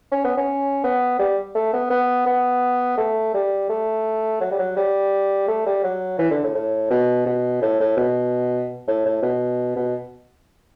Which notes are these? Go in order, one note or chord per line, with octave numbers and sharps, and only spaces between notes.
C#4
B3
C#4
B3
G3
A3
B3
B3
B3
A3
G3
A3
F#3
G3
F#3
G3
A3
G3
F#3
E3
D3
A2
A2
B2
B2
A2
A2
B2
A2
A2
B2
B2